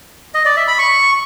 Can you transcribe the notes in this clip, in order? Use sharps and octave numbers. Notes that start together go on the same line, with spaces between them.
D#5
D5
E5
B5
C#6